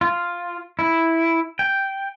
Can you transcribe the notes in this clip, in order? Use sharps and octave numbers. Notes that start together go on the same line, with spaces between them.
F4
E4
G5